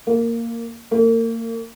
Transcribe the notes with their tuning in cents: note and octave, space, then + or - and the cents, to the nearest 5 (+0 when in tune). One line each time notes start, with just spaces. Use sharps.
A#3 -10
A#3 -35